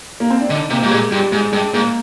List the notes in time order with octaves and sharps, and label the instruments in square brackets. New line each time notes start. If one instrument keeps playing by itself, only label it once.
[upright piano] A#3
C4
D4
[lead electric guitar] D3 [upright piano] D#4
[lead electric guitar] C3 [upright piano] A#3
[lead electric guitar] G#2 [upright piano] G3
[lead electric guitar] A#2 [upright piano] G#3
[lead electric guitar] G2 [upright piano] G3
[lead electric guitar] G#2 [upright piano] G#3
[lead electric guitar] G2 [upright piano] G#3
[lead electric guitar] G#2 [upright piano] A#3